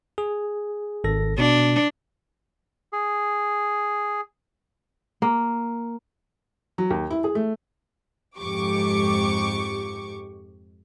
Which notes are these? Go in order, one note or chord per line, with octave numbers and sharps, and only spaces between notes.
G#4
G#1 A4 A#6
B2 D4
G#4
A#3
F#3
D#2
E4
G#4
A3
F2 G#2 G4 C#6 D6